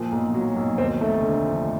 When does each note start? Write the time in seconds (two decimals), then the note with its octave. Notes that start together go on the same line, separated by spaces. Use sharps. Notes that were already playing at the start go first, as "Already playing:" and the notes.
Already playing: A#2 F3
0.12 B1
0.34 F#3
0.56 B1
0.78 D#2 C4
1.01 F1 A3
1.23 D3
1.45 F3